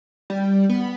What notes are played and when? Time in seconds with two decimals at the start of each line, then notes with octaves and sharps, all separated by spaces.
0.30 G3
0.69 B3